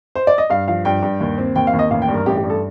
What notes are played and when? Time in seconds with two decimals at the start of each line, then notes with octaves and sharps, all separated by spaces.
0.15 C5
0.27 D5
0.38 D#5
0.50 G2 F5
0.68 F3 F5
0.85 G2 G5
1.03 G2
1.20 D#2
1.38 C4
1.56 D#2 G5
1.67 F5
1.73 D#2
1.79 D#5
1.91 A1 F5
2.02 G5
2.09 G2
2.14 A#4
2.26 A1 G4
2.37 G4
2.44 G2
2.50 A4